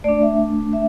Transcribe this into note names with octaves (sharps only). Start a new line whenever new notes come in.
A3 D4 D5
E5
E5